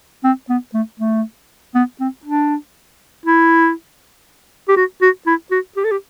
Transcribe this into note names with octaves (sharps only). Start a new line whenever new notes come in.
C4
B3
A3
A3
B3
C4
D4
E4
G4
F#4
F#4
E4
F#4
G4
A4
G4